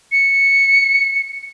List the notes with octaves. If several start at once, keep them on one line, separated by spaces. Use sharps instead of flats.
C#7